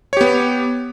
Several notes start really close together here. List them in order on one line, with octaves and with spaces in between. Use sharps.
C#5 G4 B3